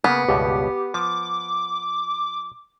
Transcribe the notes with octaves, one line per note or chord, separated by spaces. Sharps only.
C#3 A#3 B3
C#2 G2 B2 G4
F3 D6